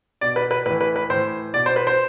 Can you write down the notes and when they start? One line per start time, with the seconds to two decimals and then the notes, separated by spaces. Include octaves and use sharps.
0.21 B2 D5
0.36 B4
0.51 B4
0.66 A2 E3 B4
0.81 B4
0.96 B4
1.10 A2 E3 C5
1.54 B2 D5
1.66 C5
1.76 B4
1.87 C5